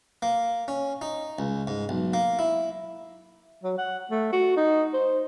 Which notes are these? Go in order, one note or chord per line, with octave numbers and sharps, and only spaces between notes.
A#3
C#4
D#4
C#2
G#2
B1
A#3
E4
F#3
F#5
A3
F#4
D#4
C5